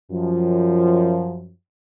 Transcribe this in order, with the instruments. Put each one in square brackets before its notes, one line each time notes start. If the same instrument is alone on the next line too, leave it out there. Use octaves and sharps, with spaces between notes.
[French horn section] F#2 F3